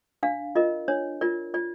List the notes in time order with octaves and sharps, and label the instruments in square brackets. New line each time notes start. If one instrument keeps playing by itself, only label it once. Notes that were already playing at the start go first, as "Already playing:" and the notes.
[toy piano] D4 F5
F4 A#4 D#5
D4 C#5
F4 A#4 D5
F4 D5